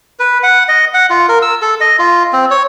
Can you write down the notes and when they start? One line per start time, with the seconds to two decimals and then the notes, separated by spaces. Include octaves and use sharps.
0.19 B4
0.43 F#5
0.69 D#5
0.94 F#5
1.10 F4
1.29 A#4
1.42 E6
1.62 A4
1.81 D#5
1.99 F4
2.33 C4
2.51 C#5